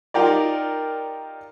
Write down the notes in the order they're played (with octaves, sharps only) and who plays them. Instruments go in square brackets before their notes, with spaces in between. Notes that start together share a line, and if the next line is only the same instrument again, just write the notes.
[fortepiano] D#4 F4 G4 A#4 D5